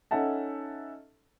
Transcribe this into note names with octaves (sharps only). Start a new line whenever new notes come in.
C#4 D#4 A4 E5 F#5 A5